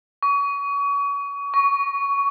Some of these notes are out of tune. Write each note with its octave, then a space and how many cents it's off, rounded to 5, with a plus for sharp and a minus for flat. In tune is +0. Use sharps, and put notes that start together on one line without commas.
C#6 +35
C#6 +15